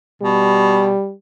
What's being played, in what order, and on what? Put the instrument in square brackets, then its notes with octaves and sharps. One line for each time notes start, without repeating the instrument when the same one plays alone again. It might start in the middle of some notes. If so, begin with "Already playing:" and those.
[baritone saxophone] B2 [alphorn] G3